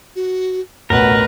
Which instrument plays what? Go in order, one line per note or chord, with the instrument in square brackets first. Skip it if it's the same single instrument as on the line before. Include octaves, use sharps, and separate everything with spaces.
[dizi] F#4
[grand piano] A1 D2 B2 [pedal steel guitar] A#4 [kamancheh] B4 [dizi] F#5